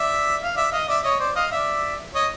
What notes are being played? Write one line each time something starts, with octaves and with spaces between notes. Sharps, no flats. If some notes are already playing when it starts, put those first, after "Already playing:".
Already playing: D5 E5
F5
D5 E5
D#5 F5
D5 E5
C#5 D#5
C5 D5
D#5 F5
D5 E5
C#5 D#5